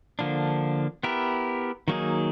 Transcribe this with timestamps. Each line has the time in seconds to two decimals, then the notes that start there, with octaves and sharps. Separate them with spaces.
0.19 D3 F3 A#3 D4
1.03 B3 E4 G4 A#4
1.88 D#3 F#3 A#3 D#4 G#4